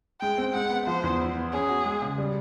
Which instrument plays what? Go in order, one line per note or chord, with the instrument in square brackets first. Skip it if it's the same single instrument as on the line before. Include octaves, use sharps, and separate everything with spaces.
[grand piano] G#3 [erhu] G5
[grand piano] C4
[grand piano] G#3 [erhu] F#5
[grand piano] B3
[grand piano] F3 [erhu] C5
[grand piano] E2
E4
B3
[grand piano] C#4 [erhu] G#4
[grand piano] F#4
G#3
C#3
G3